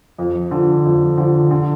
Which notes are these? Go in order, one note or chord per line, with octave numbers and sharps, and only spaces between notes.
F2
D3 F3
F2
D3 F3
D3